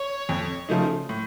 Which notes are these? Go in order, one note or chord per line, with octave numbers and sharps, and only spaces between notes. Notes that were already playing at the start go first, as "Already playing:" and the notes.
Already playing: C#5
F2
C#3 F3 A3 D#4
A2